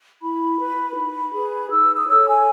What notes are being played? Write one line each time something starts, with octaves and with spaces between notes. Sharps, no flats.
E4 B5
B4
D#4
G#4 B4
D#4 E6
D#6
A4 C#5 E6
G#5